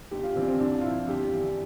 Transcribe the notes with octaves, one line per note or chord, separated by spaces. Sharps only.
G1 G4
F4
G2 E3 C4
C4
C2 D4
F4
C3 F3 E4
G1 G4
G2 E3